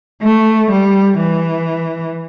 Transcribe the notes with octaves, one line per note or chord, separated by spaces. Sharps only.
A3
G3
E3